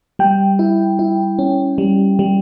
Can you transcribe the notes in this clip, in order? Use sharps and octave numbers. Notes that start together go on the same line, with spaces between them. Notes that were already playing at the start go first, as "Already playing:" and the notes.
G3 G5
E4
E4
C#4
G3
G3